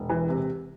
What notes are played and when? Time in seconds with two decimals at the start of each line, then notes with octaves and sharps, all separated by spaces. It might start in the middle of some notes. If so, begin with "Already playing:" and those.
Already playing: E1
0.09 E3
0.29 C3